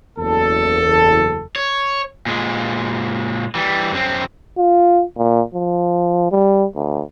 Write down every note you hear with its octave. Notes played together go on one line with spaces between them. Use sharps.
F#1 E2 A4
C#5
A#2 G#3
E3 G3
F#2 C4
F4
A#2
F3
G3
D2